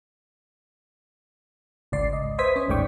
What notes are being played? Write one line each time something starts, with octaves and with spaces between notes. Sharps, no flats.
G#1 C#2 D5 C7
D#5
B4 C5 E5 D#6 G#6 B6
C#4 C#5
A1 D#2 G#2 D5 G5 C#6